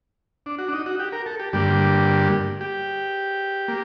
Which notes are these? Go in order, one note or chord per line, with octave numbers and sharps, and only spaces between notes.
D4
F#4
D4
D#4
F#4
G4
A#4
A4
G4
G2 D3 G3 A#3 G4
G4
A#3